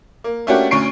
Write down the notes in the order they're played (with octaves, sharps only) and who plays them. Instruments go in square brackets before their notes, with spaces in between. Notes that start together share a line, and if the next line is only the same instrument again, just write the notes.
[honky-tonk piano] A#3
A3 A#3 C#4 D4 F#4 G4
D2 C#4 C#5 C#6 C7 D7